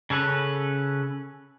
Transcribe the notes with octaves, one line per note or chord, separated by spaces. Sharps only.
C#3 C#4 A4 B4